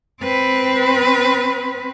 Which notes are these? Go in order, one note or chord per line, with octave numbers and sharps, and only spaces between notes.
C4 B4